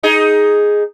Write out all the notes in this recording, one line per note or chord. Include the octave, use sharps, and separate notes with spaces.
D#4 G#4